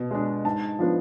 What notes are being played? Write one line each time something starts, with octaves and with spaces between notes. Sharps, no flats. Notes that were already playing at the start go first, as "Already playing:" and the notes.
Already playing: B2
G#3 D4
G#2 A5
F3 B3 D4